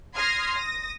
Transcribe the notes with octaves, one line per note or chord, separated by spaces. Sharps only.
C6 D#6 F6 G#6 A#6 C7
D#6 A#6